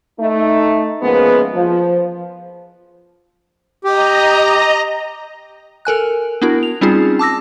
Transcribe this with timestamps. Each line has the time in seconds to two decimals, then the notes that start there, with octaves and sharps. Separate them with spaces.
0.20 A3 D#4
1.02 C#3 F3 G#3 A#3 B3
1.54 F3
3.84 G4 D#5 A#5
5.85 A4 A#4 G#5 F#6
6.42 B3 D4 E4 F#4 A#4
6.63 F7
6.81 G3 C4 C#4 D#4 F4 G#4
7.19 A5 D6 E6 A#6